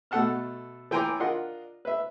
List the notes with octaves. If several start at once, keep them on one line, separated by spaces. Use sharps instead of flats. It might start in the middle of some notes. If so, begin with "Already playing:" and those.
B2 A3 A4 F#5 A5 F6
E3 G5 G#5 A#5 C6 D6
D4 F4 A#4 D#5 F#5
B4 E5